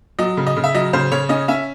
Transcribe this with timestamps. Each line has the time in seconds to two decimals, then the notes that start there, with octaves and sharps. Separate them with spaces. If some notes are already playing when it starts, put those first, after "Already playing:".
0.19 F#3 D#5
0.37 C#3
0.47 D#5
0.57 C#3
0.64 E5
0.74 F#3 D#5
0.93 C#3 C5
1.12 C#3 C#5
1.29 C#4 D#5
1.48 C#4 E5